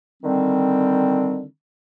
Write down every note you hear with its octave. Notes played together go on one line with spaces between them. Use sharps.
D3 D#3 G3 C4